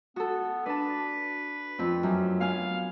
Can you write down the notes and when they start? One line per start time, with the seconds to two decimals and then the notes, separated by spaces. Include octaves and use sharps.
0.16 B3 F#4 A4
0.66 D4 B4 A5
1.79 F2 C4
2.03 F#2
2.41 B3 F5 G#5 F6